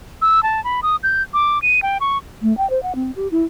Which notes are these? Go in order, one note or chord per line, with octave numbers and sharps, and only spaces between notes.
E6
A5
B5
D#6
G6
D6
D#7
G5
C#6
A3
G5
C5
F#5
C4
G4
E4